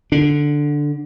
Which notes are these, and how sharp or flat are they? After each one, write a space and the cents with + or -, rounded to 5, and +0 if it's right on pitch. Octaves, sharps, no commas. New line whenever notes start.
D3 +0 D4 +0